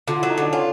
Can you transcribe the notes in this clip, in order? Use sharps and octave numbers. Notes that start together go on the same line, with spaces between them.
D3 F4
F#3 E4
D#4
D3 D4
C#4 F4